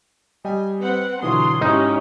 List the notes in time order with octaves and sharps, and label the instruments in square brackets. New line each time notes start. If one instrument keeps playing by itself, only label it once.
[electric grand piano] G3 D#5 G5 [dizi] G#5
[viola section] C4 F#5 [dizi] B4
[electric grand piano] B2 D3 E3 [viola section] F#3 F4 C6 [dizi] D#6
[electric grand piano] G#2 [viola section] C#4 E4 G4 [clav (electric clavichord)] D#4